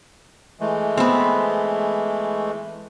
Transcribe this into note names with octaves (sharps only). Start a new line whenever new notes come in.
E3 G#3 A3
B3 C4